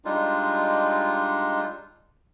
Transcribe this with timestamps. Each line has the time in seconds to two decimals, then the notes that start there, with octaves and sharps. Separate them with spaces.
0.05 G3 G#3 D4 D#4 F4